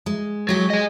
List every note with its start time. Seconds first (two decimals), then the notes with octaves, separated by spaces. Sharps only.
0.06 G#3
0.49 F#3 G#3 G4
0.70 G#4 D#5